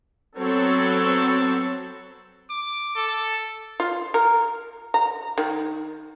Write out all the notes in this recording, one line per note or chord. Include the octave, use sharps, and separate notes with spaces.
F#3 B3 C4 A4 C#5
D6
A4
F4
A#4
A#5
D#3